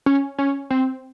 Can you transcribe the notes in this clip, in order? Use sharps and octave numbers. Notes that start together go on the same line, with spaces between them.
C#4
C#4
C4